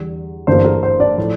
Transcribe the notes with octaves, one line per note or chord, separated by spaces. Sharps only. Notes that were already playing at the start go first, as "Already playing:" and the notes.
Already playing: E2 D3 G3
G1 G2 E3 A#3 C5
A#4
C5
D4 D5
A2 F3